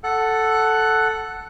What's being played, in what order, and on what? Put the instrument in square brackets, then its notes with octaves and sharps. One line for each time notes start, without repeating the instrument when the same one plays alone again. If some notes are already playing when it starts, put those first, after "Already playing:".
[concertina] A4 F#5 F#6